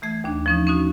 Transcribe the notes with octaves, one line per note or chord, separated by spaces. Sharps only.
E3 A3 G#6
D#2 D4
F3 C#4 D#4
C#4 D#4 F#4